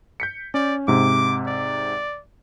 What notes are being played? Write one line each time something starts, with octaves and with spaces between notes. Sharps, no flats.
G6 B6 C#7
C#4 D5
G#2 C3 D6
D5